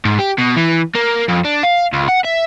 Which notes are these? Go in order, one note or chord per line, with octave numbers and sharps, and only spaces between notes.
G#2
G4
B2
E3
A#3
F2
D4
F5
C#2
F#5
E5